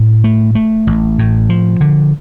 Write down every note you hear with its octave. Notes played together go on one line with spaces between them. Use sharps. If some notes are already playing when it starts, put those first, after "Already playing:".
Already playing: A2
A3
A3
A1
A2
F3
D3